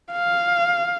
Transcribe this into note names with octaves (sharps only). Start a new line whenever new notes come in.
F5